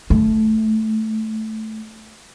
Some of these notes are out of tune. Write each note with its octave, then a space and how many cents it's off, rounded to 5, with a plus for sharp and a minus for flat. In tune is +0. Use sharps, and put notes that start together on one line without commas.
A3 -5